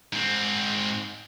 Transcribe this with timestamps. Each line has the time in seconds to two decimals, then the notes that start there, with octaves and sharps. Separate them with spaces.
0.13 G#2 C4